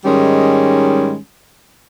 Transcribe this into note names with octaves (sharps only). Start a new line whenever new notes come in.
G#2 D#3 G3 G#3 C#4